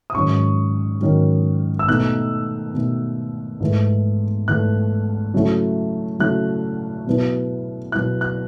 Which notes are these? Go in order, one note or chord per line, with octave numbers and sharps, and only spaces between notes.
D#6
G#2 D#3 F#3 C#4 C#6
G#2 D#3 F#3 C#4
E6
B2 A3 D#4 F#6
B2 A3 D#4
G#2 E3 A3
G#2 E3 A3 F#6
C#3 F#3 A3 E4
C#3 F#3 A3 E4 F#6
B2 F#3 B3 E4
B2 F#3 B3 E4 F#6
F#6